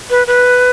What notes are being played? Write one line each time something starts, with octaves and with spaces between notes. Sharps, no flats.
B4
B4